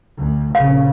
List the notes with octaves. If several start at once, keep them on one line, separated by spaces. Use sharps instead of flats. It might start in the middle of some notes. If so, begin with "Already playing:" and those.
D2
A#1 C#3 F5